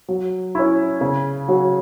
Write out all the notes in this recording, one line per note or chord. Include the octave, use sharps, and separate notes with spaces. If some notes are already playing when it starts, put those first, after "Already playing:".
F#3
C#4 E4
C#3
F#3 C#4 F#4